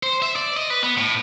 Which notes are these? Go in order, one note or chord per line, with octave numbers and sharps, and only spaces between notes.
C5
E5
D5
D#5
B4
B3
A2